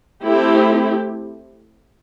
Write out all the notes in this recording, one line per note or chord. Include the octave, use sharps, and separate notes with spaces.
A3 C4 E4 G4